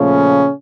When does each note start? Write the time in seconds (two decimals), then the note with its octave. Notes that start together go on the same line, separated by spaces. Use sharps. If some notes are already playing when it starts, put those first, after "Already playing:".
Already playing: A#2 C#3 F3 A3 C#4